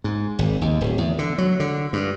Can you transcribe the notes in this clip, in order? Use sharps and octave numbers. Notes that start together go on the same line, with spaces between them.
G#2
G#1
D#2
D1
E2
D3
F#3
D3
G2